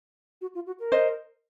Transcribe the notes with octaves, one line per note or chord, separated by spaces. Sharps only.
F#4
F4
F#4
A#4
C5 D#5